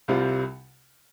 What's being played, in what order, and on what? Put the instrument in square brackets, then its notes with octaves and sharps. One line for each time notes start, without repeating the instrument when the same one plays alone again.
[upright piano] C2 C3 G3 C4 F4